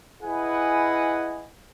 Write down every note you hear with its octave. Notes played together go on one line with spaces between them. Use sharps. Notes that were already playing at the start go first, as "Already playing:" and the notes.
E4 G#4 B4 D#5 F#5 G#5